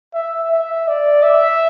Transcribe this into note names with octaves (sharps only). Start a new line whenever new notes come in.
E5
E5
D5
E5